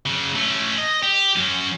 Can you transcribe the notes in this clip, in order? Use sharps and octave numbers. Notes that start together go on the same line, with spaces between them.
C#3 F#3
A3 C#4
D#5
G4
F#2 C#4